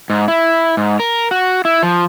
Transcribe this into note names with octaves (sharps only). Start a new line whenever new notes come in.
G#2
E4
G#2
A#4
F#4
E4
F3